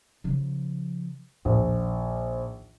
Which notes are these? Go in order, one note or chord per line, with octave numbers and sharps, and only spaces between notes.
C#3 F3
A#1 D#2